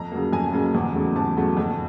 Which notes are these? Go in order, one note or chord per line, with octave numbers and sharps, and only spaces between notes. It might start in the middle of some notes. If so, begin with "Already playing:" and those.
Already playing: F2 A#5
C#3 F#3 A#3
F2 G#5
C#3 F#3 A#3
E2
C#3 F#3 A3
E2 A5
C#3 F#3 A3
F2